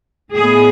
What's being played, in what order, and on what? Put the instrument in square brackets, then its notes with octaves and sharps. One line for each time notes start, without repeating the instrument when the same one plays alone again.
[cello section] A2 G#3 B3 G#4